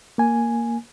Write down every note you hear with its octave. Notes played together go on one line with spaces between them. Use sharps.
A#3 G#5